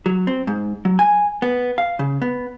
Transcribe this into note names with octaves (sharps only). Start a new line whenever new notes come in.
F#3
C4
G#2
F#3
G#5
B3
F5
C#3
B3